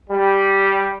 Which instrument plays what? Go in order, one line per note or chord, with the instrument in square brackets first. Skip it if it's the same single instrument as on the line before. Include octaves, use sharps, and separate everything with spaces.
[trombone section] G3